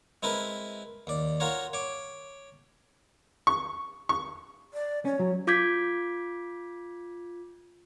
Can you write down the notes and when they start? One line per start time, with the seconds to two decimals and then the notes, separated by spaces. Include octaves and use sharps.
0.23 G#3 C4 E4 A#4 B4
1.07 D#2 D5
1.40 F4 F#4 A#4 C#5
1.73 C#5 D6
3.47 C#6
4.09 C#6
4.74 D5
5.05 C#4 C#5
5.19 F#3
5.47 F4 D6 G6 G#6 B6